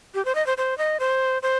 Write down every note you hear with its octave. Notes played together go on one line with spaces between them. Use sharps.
G4
C5
D#5
C5
C5
D#5
C5
C5